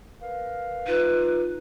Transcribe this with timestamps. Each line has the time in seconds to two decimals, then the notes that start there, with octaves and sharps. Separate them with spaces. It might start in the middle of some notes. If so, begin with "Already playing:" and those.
0.20 A#4 B4 F5
0.87 D#4 F4 B4